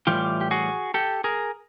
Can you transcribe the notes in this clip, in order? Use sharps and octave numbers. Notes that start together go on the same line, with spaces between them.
A2 E3 G3 F4 G4
G4
F#4 G#4
G4 A4
G#4 A#4